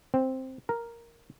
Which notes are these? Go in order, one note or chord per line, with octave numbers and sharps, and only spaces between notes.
C4
A#4